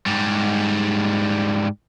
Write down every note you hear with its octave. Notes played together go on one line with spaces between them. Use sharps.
G#2 G3